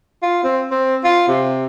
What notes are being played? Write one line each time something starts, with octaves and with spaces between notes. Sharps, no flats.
F4
C4
C4
F4
C3